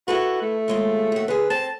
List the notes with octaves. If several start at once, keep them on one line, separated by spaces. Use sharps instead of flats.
E4 F#4 A4 B4
A3
D#2 G#3 F4
D#2 F#4
D3 G#4 B4
C4 A5